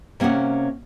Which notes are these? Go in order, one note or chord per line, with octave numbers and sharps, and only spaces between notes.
C3 A#3 C#4 C#5 F#5